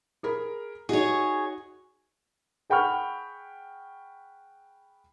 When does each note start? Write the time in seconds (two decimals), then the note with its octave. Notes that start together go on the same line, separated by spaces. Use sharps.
0.23 G#4 A#4 B5
0.89 D#4 F#4 G#4 C#5
2.70 G#4 F#5 G5 B5 C#6 F6